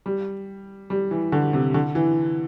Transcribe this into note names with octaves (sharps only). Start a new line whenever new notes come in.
G3
G3
E3
D3
C3
D3
E3